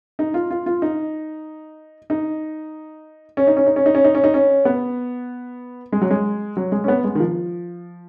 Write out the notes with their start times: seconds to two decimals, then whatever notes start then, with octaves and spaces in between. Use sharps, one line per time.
0.19 D#4
0.34 F4
0.51 F4
0.66 F4
0.82 D#4
2.10 D#4
3.37 C#4
3.47 D#4
3.57 C#4
3.66 D#4
3.76 C#4
3.86 D#4
3.95 C#4
4.05 D#4
4.15 C#4
4.24 D#4
4.34 C#4
4.65 B3
5.92 G#3
6.01 F#3
6.11 G#3
6.57 F#3
6.72 G#3
6.84 C#4
6.88 B3
7.04 G#3
7.15 D#3
7.20 F3